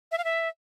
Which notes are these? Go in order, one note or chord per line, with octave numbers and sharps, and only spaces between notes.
E5
F5
E5